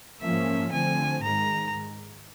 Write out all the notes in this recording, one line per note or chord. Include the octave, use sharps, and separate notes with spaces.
G#2 F3 A#3 C#4 E5
D3 F3 A3 C4 G#5
G#2 D#3 G#3 A#5